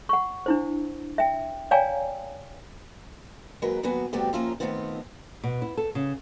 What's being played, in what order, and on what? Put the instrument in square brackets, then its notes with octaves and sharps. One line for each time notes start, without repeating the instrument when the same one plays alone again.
[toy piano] F#5 C#6
D4 E4 C5
E5 G5
C#5 D5 F5 G5 G#5 A#5
[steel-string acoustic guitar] D#2 F#3 G#3 A#4 B4
D#2 F#3 B3 F#4 B4 G#5
C3 G3 A3 B3 F#4 G4
F3 A#3 C#4 F4 E5 A#5
D#3 E3 A3 B3 C4 F4
[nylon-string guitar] B2
E4
A4
C#3